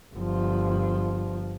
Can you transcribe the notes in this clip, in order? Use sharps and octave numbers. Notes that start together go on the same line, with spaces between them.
G1 F3